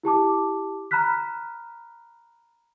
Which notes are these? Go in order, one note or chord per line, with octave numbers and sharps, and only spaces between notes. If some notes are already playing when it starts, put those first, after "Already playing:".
E4 G4 A5 D6
A#5 B5 F6 F#6 B6